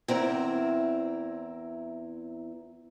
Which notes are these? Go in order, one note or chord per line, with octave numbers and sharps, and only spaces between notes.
E2 C4 E4 A#4